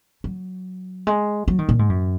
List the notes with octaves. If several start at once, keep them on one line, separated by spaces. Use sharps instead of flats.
F#3
G#3
F#3
D#3
A#2
G#2
F#2